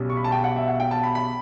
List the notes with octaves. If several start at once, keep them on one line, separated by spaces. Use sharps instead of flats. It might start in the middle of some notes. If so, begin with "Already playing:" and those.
Already playing: B1 B2 G3 C#4
C#6
B5
A5
G5
F#5
E5
F#5
G5
A5
B5
B5